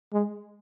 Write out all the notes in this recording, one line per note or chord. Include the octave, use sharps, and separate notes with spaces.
G#3